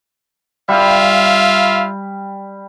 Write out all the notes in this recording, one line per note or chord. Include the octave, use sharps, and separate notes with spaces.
G3 F4 E5 F5